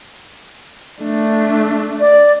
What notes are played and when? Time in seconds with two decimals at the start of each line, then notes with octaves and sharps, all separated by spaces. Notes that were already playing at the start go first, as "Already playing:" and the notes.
1.01 A3 D4
2.00 D5